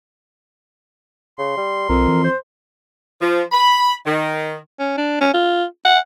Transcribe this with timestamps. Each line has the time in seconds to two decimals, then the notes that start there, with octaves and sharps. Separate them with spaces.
1.38 C#3 C6
1.57 G3
1.89 B1 F2 A#4
2.08 E3
2.24 C5
3.21 F3
3.52 B5
4.06 D#3
4.79 C#4
4.97 D4
5.21 C#4
5.34 F4
5.85 F#5